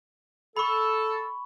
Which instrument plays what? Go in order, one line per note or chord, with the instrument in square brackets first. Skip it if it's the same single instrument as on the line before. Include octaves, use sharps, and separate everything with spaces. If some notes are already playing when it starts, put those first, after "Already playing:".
[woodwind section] A4 [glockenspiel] B5 C#6